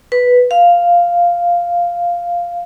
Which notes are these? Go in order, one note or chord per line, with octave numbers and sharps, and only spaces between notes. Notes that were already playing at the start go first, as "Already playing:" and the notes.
B4
F5